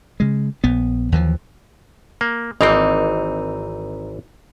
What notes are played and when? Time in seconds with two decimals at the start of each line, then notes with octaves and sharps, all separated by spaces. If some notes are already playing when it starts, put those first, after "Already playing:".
0.20 C#3 G#3
0.64 A#1 B3
1.12 D#2 E3 F3
2.21 A#3
2.61 G#1 E3 A#3 C4 D#4